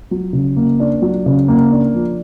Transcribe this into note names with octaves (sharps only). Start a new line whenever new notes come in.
F#3
C#3
A#3
D4
F#3
C#3
A#3
D4
F3